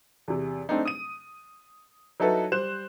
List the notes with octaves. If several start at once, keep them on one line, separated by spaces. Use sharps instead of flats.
E2 C3
A3 C4 D4 D#4
D#6 D#7
F#3 D#4 E4 F#4 A4 B4
G3 C5 F#6 E7